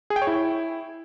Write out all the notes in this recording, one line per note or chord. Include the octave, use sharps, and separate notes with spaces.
G#4
G5
C#5
E4